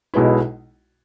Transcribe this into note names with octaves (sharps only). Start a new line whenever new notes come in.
B1 B2 G#3 B3 E4